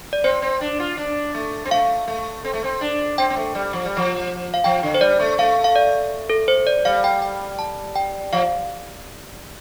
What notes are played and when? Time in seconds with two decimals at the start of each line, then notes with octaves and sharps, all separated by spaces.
0.13 D5
0.24 C4 C5
0.42 C4
0.61 D4
0.80 F4
0.97 D4
1.34 A3
1.65 C4
1.71 A3 F5
2.08 A3
2.45 C4
2.54 A3
2.64 C4
2.81 D4
3.18 C4 G5
3.30 C4
3.36 A3
3.55 G3
3.73 F3
3.85 G3
3.97 F3
4.54 F5
4.64 F3 G5
4.83 D3
4.94 C5
5.01 G3 D5
5.20 A3
5.38 A3 F5
5.64 F5
5.76 D5
6.30 A4
6.48 C5
6.67 D5
6.85 G3 F5
7.04 G5
7.22 G5
7.59 A5
7.95 G5
8.33 F3 F5